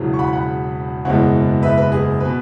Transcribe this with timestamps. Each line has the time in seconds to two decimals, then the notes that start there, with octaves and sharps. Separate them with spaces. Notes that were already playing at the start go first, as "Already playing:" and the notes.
Already playing: E1 E2 C#3 F#3
0.14 C#6
0.19 F#5 B5
0.33 F#5 B5
1.05 F#1 E2 B2 G#3 C#5 F#5
1.63 B4 E5
1.78 B4
1.92 G#4
2.20 B2 B4